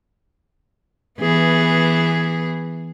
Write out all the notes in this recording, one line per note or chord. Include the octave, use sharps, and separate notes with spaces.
E3 B3 G#4